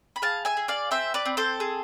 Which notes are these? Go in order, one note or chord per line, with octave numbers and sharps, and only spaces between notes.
B5
G#4 F5 A5
E5 G#5
G#4
D5 F5
C4 C5 E5
B4 D5
C4
A4 C5
G#4